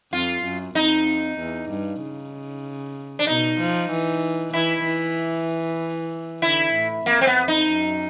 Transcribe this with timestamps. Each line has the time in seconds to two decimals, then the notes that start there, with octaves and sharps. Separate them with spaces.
0.12 F2 F4
0.44 F#2
0.75 F2 D#4
1.39 E2
1.70 G2
2.02 C#3
3.19 D4
3.27 B2 D#4
3.59 F3
3.90 E3
4.53 E3 E4
4.85 E3
6.42 D3 E4
6.74 A2
7.06 F2 A#3
7.21 C4
7.27 B3
7.48 D#4
7.68 F#2